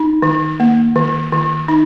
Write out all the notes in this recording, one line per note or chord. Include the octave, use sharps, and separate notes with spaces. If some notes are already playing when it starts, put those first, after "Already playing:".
Already playing: D#4
D#3
A#3
D#3
D#3
D#4